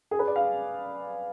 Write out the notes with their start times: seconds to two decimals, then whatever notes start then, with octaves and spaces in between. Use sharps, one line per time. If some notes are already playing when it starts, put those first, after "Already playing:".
0.11 G#4
0.19 B4
0.28 D5
0.36 F5